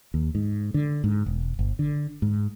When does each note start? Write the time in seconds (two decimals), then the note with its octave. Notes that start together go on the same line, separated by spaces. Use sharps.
0.14 D#2
0.35 G#2
0.74 D3
1.04 G#2
1.26 E1
1.59 G1
1.79 D3
2.22 G#2